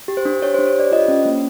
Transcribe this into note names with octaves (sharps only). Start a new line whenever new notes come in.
G4
C5
D4
G4 C#5
C5
D4
C#5
G4 D5
F4 D#5
C#4
A#3